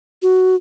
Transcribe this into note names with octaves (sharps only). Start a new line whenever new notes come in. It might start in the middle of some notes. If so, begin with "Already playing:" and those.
F#4